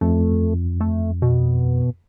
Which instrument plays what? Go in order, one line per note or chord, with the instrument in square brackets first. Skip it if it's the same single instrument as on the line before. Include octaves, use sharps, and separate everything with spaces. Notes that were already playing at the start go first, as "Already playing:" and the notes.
[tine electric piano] F2 [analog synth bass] A3
[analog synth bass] A3
B2